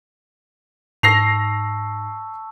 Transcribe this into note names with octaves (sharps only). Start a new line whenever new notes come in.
G#2 A5 C#6 E6 A#6 C7 F7